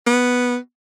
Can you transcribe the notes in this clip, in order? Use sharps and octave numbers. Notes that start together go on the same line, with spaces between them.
B3